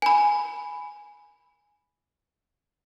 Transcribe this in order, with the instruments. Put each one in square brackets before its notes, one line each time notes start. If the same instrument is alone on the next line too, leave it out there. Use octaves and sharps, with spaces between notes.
[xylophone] G#5 B5